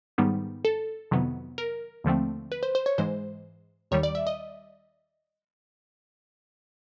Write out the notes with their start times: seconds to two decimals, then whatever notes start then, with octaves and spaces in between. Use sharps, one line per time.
0.18 G#2 D#3 G3 B3
0.65 A4
1.11 F2 C3 D#3 F#3 B3
1.58 A#4
2.04 D#2 D3 F3 A3 C4
2.52 B4
2.63 C5
2.75 C5
2.86 C#5
2.98 G#2 E3 G#3 C5
3.91 D#2 D#3 G3 C#5
4.03 D5
4.15 E5
4.27 D#5